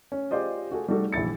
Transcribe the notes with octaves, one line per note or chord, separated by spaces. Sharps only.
C#4
F4 G4 G#4 C5 D5 D#5
F#4 G#4 A4
G3 A3 D#4 F#4 G#4 A4
A#1 E3 E4 A6 C#7